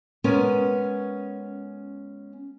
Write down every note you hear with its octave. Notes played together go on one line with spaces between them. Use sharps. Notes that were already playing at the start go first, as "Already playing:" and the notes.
G#3 B3 C#4 A#4 B4